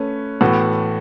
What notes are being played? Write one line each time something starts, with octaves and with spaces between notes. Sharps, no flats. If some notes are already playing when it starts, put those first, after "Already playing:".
Already playing: A3 C#4 B4
A2 E3 B3 F#4 A4